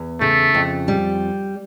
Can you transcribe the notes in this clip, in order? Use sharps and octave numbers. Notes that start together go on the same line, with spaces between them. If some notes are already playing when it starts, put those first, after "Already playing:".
Already playing: E2
C#3 A3
F2
G3